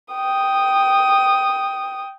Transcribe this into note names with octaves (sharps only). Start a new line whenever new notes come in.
G5 D#6